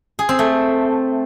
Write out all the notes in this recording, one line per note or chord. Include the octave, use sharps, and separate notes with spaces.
G#4
C4
A3